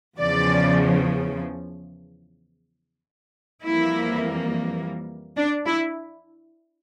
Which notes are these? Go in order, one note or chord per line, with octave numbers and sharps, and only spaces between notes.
E2 C#3 F3 D5
F2 E3 G3 A#3 E4
D4
E4